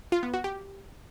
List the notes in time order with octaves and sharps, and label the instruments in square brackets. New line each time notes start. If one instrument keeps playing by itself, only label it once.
[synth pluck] F4
B3
F#4
G4